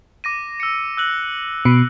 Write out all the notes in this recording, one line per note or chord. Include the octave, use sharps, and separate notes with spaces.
D6 A#6 D#7
E6 C#7
E6 F#6 F#7
B2